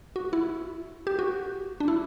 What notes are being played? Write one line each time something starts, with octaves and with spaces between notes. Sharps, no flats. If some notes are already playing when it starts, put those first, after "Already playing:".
F#4
E4
G4
F#4
D4
E4